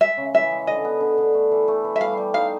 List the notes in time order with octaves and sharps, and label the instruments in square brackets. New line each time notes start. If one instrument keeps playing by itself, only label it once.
[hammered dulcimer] G#3 [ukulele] E5
[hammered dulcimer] C#3
[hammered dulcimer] E3 [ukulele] E5
[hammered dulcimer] G#3
[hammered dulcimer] D3 [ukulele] D#5
[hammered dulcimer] B3
D3
D3
A3
E3
A3
E3
[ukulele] E5
[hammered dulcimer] G3 [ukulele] F5
[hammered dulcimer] G3
[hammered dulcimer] D#4 [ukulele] F5